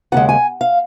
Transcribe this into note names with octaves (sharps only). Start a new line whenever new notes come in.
D#2 C#3 G#3 F#5
G#5
F5